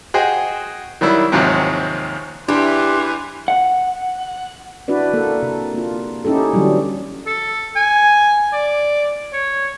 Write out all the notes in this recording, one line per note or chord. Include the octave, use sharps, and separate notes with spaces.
F#4 G#4 C5 D#5 G5 G#5
D#3 F#3 G3 E4
D#2 G#2 C3 F3 F#3 C4
E3 D4 G4 E5 C6
F#5
D4 E4 F#4 B4 D5
A#3 A4
C3
A#3 F4
C#4 D#4 E4 G4 A4
D3 E3 F#3 G3
A4
G#5
D5
C#5